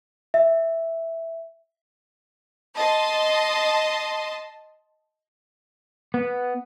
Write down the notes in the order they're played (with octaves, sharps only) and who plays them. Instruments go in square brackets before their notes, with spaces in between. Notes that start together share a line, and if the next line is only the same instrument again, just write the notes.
[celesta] E5
[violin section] D#5 A5 C6
[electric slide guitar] B3